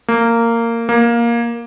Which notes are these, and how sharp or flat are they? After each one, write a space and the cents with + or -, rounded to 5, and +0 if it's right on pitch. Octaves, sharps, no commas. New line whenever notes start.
A#3 -15
A#3 +10